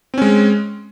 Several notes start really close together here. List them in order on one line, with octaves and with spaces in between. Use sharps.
C4 C#4 G#3